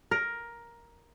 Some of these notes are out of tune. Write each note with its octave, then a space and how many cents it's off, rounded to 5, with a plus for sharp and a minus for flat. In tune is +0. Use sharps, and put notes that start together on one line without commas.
A#4 +10